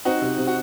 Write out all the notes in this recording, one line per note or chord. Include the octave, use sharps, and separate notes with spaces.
C4 D#4 F#4
C3
C3
F#4